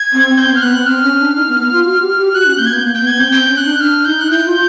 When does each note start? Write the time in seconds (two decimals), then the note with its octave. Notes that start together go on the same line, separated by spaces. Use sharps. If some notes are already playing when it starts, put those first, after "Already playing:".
Already playing: G#6
0.13 C4
0.37 C4 G6
0.50 B3
0.56 F6
0.62 B3 F#6
0.75 C4
0.86 C4 F6
1.03 C#4
1.19 D4
1.36 D#4
1.48 B3
1.60 B3
1.72 F4
1.85 F#4
2.01 G4
2.18 G4
2.34 F#4 F#6
2.46 C#4
2.58 A#3 G6
2.66 G#6
2.71 B3 G6
2.82 A#3
2.95 B3 G6
3.07 G#6
3.16 C4 G6
3.32 C4 G6
3.48 C#4
3.57 F#6
3.65 D4
3.80 D4 F6
4.05 D#4 G6
4.21 F#6
4.30 E4 G6
4.46 F4